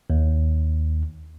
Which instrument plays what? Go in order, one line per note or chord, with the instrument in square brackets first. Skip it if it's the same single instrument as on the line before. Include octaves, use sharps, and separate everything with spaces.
[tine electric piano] D#2